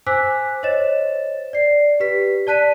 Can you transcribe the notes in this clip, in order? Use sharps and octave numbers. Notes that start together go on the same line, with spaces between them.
C5 G#5 D6 E6 F#6 B6
C5 C#5 D#5 A6 E7
D5 C7
G4 B4 B6
D5 A5 F#6 B6 D#7